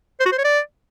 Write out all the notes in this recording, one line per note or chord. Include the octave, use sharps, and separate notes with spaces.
C5
F#4
C5
C#5
D5